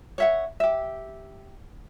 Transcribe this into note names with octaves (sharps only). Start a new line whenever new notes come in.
C#5 E5 F#5
G4 E5